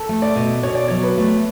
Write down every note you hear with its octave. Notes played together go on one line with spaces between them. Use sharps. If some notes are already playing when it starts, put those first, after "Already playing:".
Already playing: A4
A3
D5
B2
B2 C#5
D5
F#3 C#5
B4
A3